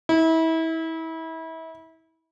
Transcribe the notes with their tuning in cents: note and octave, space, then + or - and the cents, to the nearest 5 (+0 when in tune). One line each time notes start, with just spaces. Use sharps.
E4 -30